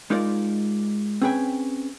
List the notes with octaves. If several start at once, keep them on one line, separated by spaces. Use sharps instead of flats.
G#3 D#4 F4 A#4 D5
C4 C#4 G#4 B4 G5 G#5